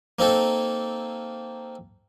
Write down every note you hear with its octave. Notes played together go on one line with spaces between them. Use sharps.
A#3 C4 D#4 A4